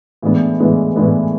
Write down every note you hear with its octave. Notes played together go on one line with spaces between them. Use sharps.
A2 E3 G#3 B3 D4
A2 E3 G#3 B3 D4
A2 E3 G#3 B3 D4